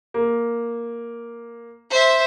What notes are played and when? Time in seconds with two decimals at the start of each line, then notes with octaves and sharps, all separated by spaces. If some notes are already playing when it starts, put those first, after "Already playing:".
0.14 A#3
1.91 C5 E5